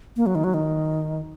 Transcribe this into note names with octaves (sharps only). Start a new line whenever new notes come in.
A#3
F#3
D#3
F#3
D#3